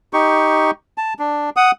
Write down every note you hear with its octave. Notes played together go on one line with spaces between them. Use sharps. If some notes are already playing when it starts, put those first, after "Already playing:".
D#4 G4 C#6
A5
D4
F#5 D#6